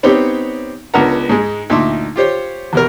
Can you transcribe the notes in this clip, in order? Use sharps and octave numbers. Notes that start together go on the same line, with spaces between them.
B3 C4 D#4 G4 C#5
C#2 B3 D4 A#4 F#5 A#5
G#2 G#3
D2 A#2 D#4 E5 C6 D6
F4 G4 C5 C#5
E2 B2 A#4